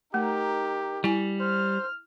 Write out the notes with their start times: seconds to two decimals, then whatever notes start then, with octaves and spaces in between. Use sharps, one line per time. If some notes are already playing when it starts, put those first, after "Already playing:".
0.14 A3 D#4 G4 A#4
1.04 G3 E4 G#5
1.40 C5 F6